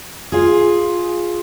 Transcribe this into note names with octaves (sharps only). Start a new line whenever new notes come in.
F4 G#4